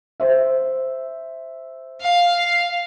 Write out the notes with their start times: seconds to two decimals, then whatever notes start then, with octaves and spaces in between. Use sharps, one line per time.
0.20 C5 E5
2.01 F5